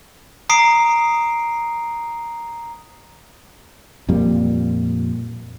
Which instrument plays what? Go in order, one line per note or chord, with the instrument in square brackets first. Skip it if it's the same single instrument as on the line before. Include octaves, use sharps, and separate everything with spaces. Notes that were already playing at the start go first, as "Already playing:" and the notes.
[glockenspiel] A#5 D#6 C7 D7
[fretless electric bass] F2 A#2 G3 A#3